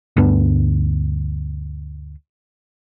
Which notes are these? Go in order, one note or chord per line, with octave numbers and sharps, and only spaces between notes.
D2 G2 B3 D4